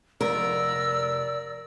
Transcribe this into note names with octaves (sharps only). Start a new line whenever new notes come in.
F1 A#4 D5 E6